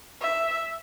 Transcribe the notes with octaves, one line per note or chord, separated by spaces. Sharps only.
E5